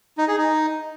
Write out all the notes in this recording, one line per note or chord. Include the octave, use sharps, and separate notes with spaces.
D#4
G#4
D#4